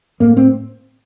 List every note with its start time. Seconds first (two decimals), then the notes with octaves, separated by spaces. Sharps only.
0.20 A2 A#3
0.37 C4